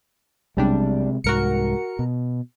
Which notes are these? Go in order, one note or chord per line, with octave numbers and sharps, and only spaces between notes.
B1 C3 G3 G#3 D4
C2 G#2 F#4 A#4 C#7
B2